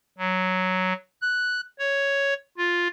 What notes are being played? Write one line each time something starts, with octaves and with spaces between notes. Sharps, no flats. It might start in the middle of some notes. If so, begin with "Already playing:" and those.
F#3
F#6
C#5
F4